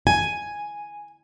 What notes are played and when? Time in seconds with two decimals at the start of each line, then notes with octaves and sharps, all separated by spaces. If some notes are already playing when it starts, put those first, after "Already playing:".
0.07 G#5